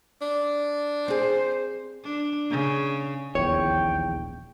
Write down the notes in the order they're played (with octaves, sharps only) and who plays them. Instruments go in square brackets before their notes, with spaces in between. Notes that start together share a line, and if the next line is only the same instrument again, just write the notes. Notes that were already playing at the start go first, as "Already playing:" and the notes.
[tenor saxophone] D4
[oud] C4 G#4 [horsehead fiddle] C5
[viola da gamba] D4
C#3
[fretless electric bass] D#1 A#1 E2 [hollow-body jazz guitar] C#5 [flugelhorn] G5